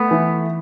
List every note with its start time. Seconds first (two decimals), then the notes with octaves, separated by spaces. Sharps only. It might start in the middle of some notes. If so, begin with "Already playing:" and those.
Already playing: A3 B3
0.11 E3